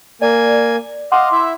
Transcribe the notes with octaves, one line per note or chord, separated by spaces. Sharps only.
A#3 D5 G#5
D#5 F5 F#5 C6 D6
E4 E5